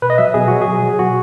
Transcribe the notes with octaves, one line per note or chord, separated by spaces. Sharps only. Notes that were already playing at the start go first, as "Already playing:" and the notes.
B2 B4
D#5
F#3 E5
B2 G#4
F#3 F#4
G#4
B2
F#3
B2 F#4